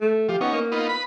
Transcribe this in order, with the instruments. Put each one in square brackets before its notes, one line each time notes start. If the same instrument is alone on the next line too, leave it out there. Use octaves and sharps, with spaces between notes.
[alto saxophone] A3
[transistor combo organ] F3 [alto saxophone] G4
[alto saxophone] B3 [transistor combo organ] C#4 D#4
[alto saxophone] A#3
[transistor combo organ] B3 D#4 F4
B4 B5